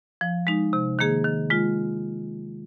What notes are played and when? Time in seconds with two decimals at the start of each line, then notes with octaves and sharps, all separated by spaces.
0.21 F3
0.47 G#3 D#4
0.73 C3
0.99 D#3 A#3 G#4
1.24 D#3
1.50 G#3 F4